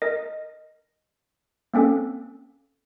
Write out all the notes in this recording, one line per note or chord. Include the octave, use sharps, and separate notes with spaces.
A#4 D#5
A#3 C4 C#4 A4